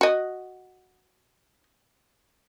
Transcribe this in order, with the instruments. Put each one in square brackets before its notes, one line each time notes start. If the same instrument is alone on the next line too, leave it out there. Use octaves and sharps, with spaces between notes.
[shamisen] F#4 D#5